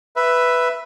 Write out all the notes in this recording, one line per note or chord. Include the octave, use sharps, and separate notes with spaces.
B4 E5